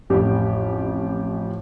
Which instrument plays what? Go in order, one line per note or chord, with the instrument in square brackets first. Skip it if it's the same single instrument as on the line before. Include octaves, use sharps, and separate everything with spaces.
[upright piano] A1 F2 G4